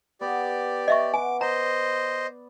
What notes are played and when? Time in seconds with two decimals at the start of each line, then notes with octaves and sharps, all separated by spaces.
0.21 B3 G4 D5
0.88 D#5 E5 C#6
1.14 B4 F#5 G#5 D6
1.41 C5 D5 D#5 A#5